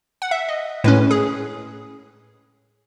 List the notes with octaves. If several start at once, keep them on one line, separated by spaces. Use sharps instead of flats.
F#5
E5
D#5
A2 G#3 C#4 B4
G#4